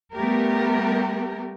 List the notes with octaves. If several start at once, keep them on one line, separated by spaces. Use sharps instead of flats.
G3 A3 B3 G4 A#4